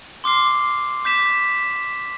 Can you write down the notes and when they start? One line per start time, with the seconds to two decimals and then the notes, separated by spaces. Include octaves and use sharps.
0.24 C6 D6 F6 C7
1.04 D6 G6 B6 E7